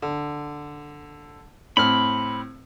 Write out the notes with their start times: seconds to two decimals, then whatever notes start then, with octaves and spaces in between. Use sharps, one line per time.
0.02 D3
1.77 A2 C4 B5 F6